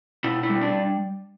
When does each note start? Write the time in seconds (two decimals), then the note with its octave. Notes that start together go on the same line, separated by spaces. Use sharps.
0.24 B2 E4
0.43 E4
0.50 G3
0.61 D4